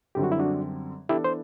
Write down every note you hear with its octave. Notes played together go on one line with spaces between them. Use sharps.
F#2 D3 G3 C4 G4
F#4
E4
D4 F#4
E3 B3 D4 E4 G4 A4
C5